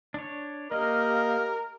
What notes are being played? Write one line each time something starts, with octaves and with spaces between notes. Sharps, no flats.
D4 C#5
A#3 G4 A#4 D#5 F6